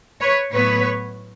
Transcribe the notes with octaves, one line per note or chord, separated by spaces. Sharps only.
B4 C#5
A2 F#3 B3 B4 C#5